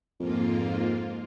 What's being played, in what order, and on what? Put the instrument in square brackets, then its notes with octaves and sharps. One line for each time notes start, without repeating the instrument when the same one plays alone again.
[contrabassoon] F2 [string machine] G#2 A#3 F4